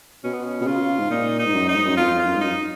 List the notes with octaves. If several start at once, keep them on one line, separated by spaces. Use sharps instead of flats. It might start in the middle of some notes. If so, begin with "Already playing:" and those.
B2 C#4
B3
C#4
B2
C#3 F4
G#2
A#2 D#4
D#4
G#2
F#2
D#4
G#2
F#2
F2 F4
F4
F#2
G#2
F#2 D#4